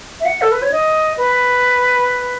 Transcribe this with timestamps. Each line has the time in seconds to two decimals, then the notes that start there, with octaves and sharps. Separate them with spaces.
0.20 E5
0.26 F#5
0.42 A4
0.52 B4
0.62 C#5
0.71 D#5
1.17 B4